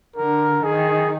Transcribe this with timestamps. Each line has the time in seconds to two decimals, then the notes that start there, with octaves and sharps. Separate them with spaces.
0.16 D3 A#4
0.63 D#3 G#4